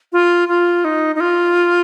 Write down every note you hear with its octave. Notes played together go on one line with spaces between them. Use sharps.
F4
F4
D#4
D#4
F4